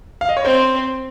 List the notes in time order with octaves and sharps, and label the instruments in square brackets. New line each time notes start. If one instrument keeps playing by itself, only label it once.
[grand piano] F5
D#5
C#5
[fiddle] C4 [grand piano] C5